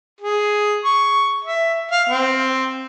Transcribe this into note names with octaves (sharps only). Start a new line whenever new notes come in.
G#4
C#6
E5
F5
C4